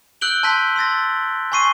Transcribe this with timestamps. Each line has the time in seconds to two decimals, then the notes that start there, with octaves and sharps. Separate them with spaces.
0.21 E6 F#6 G6 D7 F#7 G7
0.43 A5 C6 E6 G6 B6
0.76 C6 E6 A6 A#6
1.52 G#5 C6 C#6 C7 D#7